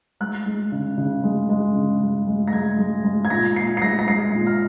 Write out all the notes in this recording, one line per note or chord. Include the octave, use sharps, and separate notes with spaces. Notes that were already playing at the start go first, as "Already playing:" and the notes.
G#3 F#6
G#3
C#3
C#3
G#3
G#3
C#3
G#3
G#3
A#6
G#3 G#6
G#3
G#3
G#6
A#2 A#6
A#2 C7
C7
G#3 A#6
A#6
G#3 C7
A#2
F6